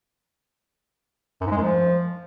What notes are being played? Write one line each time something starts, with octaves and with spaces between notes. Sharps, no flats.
F#2
G#2
G#3
F#2
F3